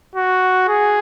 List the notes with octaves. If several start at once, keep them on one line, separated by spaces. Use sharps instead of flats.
F#4
G#4